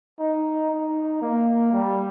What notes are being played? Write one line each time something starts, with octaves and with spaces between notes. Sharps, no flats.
D#4
D#4
A#3
G3